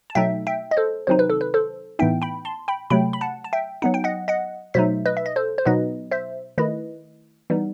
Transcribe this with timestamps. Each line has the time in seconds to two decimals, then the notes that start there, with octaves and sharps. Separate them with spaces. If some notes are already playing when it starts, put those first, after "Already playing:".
0.10 A5
0.15 B2 F#3 A3 D#4 E5 G5
0.47 E5 G5
0.71 D#5
0.77 A4 C5
1.07 C3 D#3 F#3 C4 D#4 C5
1.19 B4
1.30 A4
1.41 B4
1.54 A4 C5
1.99 A2 E3 B3 D#4 E5 G5
2.22 G5 B5
2.45 A5 C6
2.68 G5 B5
2.90 C3 F#3 A3 G5 B5
3.13 B5
3.21 F#5 A5
3.44 A5
3.53 E5 G5
3.82 F#3 B3 D#4 F#5
3.94 G5
4.04 D#5 F#5
4.28 D#5 F#5
4.74 B2 F#3 A3 D#4 C5 E5
5.06 B4 D#5
5.17 E5
5.26 D#5
5.36 A4 C5
5.58 C5
5.66 B2 F#3 B3 D#4 B4 D#5
6.12 C5 E5
6.58 D#3 A3 E4 B4 D#5
7.50 E3 G3 B3 D#4